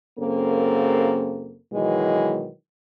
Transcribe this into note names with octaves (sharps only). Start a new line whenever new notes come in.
F#2 C#3 A#3 C4 A4
B2 D#3 E3 F#3 G#3